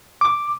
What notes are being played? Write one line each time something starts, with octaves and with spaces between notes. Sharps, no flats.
D6